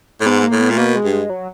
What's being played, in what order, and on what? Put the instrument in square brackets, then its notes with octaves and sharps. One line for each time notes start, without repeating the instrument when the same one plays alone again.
[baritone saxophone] A2
[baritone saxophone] G#2 [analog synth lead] B3
[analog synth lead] A#3
[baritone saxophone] A2
[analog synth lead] B3
[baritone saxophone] A#2 [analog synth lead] A3
[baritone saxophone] B2 [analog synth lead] A#3
[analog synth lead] G#3
[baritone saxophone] G2
[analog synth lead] G#3
F#3